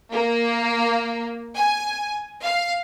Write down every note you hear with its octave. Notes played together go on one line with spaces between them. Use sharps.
A#3
G#5
F5